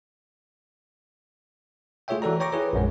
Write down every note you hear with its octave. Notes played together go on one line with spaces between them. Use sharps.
A3 F4 G#4 C#5 E5 G5
E3 F#4 A4 D5 A#5
C#5 G5 A#5 C#6 D6 A#6
E4 G#4 B4 C#5
A#1 F#2 G#3